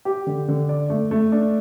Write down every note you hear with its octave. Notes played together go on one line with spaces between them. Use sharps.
G4
D3
D3
D5
A3
A3
D4